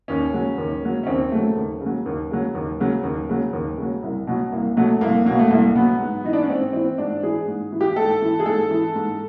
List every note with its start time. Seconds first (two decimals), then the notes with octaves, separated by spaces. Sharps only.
0.08 D#2 C#4
0.33 C#3 F#3
0.58 D#2
0.83 C#3 F#3
1.03 C#4
1.07 D#2 C4
1.31 C#3 F#3 A3
1.56 D#2
1.81 C#3
1.86 F#3
2.06 D#2
2.31 C#3 F#3
2.55 D#2
2.80 C#3 F#3
3.04 D#2
3.29 C#3 F#3
3.53 D#2
3.78 C#3 F#3
4.03 C2
4.27 B2 F#3
4.52 C2 A#3
4.77 B2 F#3 A3
5.01 C2 A#3
5.26 B2 F#3 A#3
5.39 A3
5.50 C2 A#3
5.75 B2 F#3 B3
6.00 G#2
6.24 E3 D#4
6.33 D4
6.41 C#4
6.49 G#2 C4
6.73 E3 C4
6.98 G#2 D4
7.23 E3 G#4
7.48 G#2
7.72 E3
7.81 G4
7.96 G#2 A4
8.22 E3
8.40 G#4
8.46 G#2 A4
8.71 E3
8.95 G#2